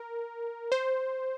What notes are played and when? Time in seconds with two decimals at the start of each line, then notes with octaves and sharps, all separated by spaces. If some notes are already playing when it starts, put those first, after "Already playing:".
Already playing: A#4
0.72 C5